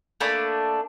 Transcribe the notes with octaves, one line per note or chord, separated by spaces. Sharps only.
A3 A#3 D4 B5